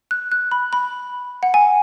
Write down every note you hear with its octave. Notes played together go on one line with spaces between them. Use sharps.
F#6
F#6
B5
B5
F#5
G#5